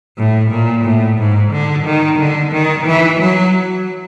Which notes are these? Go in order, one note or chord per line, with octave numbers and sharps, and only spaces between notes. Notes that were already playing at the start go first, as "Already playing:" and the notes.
A2
A#2
A2
G#2
D3
D#3
D3
D#3
E3
F#3